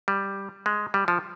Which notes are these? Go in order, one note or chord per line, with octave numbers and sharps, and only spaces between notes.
G3
G#3
G3
F3